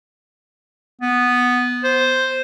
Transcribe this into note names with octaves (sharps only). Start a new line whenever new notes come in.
B3
C5